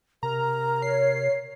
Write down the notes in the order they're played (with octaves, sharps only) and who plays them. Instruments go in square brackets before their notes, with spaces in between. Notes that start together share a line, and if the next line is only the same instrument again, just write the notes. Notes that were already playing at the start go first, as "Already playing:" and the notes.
[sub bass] C3 [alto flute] A#4 [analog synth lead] A#5
[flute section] C#5 [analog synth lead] C7